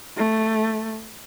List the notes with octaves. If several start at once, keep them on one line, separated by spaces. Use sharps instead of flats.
A3